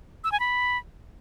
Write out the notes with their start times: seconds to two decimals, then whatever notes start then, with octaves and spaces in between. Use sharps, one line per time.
0.24 E6
0.32 G#5
0.40 B5